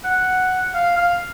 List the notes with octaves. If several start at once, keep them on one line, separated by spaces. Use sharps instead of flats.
F#5
F5
F5